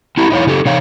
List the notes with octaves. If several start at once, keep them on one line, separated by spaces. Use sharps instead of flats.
C4 E4 G4 A#5
D#4 E4 C#5 F5
C#3 D#4 G4 A4
C3 D#4 C#5 F5